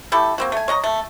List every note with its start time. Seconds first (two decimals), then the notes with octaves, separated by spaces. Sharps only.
0.12 A3 E4 G4 A4
0.38 A#3 C4 F#4
0.52 A3 G#5
0.68 C#5 D#5 F#5 A#5
0.84 A3